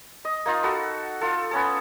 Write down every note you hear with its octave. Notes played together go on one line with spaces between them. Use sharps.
D#5
A#3 D#4 F4
F#4 A4 B5
F4 A4
B3 C#4 A4